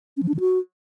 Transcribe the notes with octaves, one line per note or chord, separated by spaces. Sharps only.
C#4
F3
D4
D#3
F#4